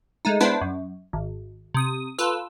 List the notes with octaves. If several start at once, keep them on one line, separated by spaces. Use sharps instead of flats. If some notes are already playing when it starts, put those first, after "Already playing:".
G#3 A3 D#4
G#3 B3 D4 E4 B4 C5
F#2
G#1
C3 D#6
F4 A4 B4 E6